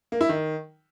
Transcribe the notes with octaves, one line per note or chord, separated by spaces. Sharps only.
A#3
E4
D#3